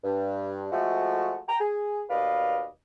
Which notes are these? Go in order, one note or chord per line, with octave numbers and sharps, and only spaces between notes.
G2
F3 G#3 A3 F#4
G5 A#5
G#4
D#2 B2 B4 D5 D#5 F5